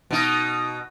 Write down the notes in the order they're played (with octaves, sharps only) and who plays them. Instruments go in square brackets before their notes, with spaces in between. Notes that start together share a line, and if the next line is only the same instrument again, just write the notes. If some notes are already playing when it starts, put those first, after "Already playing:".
[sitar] B2 D#4